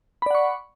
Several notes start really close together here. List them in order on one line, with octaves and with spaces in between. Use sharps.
B5 D5 F#5 C#6